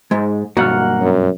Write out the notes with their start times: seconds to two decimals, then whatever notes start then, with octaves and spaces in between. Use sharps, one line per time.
0.11 G#2 G#3
0.57 B1 G2 A#3 F#4 F#5 F6
1.00 F#2